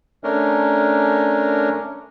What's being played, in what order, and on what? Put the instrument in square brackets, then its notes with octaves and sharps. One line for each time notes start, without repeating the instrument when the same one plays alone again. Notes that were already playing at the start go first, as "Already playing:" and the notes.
[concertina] A3 C#4 D4 A#4